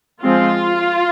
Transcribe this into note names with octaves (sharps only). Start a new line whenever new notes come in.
F3 G#3 C4 F4